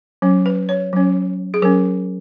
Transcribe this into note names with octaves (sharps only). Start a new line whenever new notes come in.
F#3 C#4
B4
C#5
F#3 C#4
G#4
F#3 C#4 A#4